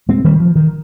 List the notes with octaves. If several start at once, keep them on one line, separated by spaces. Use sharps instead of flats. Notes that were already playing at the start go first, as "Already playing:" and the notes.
G#3 C4
D#3 G3
F3
D#3